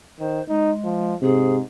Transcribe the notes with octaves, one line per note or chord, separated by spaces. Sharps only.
D#3 C5
G#3 D#4
F3
G#2 C3 G#4